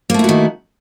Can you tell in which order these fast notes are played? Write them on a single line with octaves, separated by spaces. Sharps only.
A#3 A3 E4 F#4 D#3